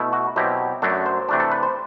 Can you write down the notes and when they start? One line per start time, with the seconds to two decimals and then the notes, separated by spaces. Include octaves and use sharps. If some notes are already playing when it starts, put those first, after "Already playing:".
Already playing: B2 A3 E4
0.13 F#4
0.36 B2 F#3 C4 E4 G4
0.82 F#2 F#3 A3 D4 A4
1.06 C5
1.29 C3 E3 A3 D4
1.40 A4
1.52 B4
1.63 C5